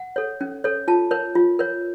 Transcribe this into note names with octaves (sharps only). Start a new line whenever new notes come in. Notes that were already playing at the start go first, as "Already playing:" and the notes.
Already playing: F#5
A4 C#5
C#4
A4 C#5
F4 A5
A#4 C#5
F4
A#4 C#5